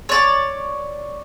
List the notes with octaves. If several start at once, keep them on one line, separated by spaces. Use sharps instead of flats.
C#5 D5